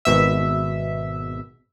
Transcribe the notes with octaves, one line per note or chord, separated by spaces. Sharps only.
G#1 B2 E5